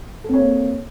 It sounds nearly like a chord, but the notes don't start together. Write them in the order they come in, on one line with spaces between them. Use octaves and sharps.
A4 C4 C#5 A#3